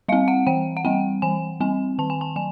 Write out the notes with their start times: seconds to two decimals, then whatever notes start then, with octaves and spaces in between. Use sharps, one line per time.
0.08 G3 F5
0.12 C4
0.28 F#5
0.47 E3 G5
0.77 F#5
0.84 G3 C4 G5
1.22 E3 G#5
1.60 G3 C4 G#5
1.98 D#3 A5
2.10 G#5
2.21 A5
2.36 F#3 G#5